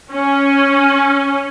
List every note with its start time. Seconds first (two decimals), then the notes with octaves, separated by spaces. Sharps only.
0.11 C#4